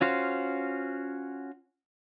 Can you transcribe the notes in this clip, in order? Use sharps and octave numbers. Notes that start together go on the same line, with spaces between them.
C#4 F4 F#4 C5 F5